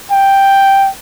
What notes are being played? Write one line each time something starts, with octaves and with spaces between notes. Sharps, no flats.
G5